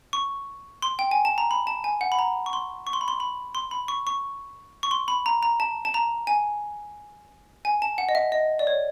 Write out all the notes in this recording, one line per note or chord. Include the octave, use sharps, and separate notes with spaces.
C#6
C6
G5
G#5
A5
A#5
B5
A5
G#5
F#5
B5
A#5
C#6
C6
C#6
C6
B5
C6
B5
C6
B5
C#6
C#6
C#6
C6
B5
A#5
A#5
A5
A5
A#5
G#5
G#5
A5
F#5
D#5
E5
D#5
D5
C#5